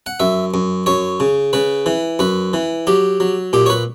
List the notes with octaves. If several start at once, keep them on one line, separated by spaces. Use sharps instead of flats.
F#5
F#2 E5
F#2
F#2 C#5
C#3
C#3 B4
E3
F#2 B4
E3
F#3 G4
F#3
A#2 G4
C#5
B4